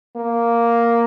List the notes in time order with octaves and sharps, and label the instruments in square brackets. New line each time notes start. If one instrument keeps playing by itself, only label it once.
[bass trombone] A#3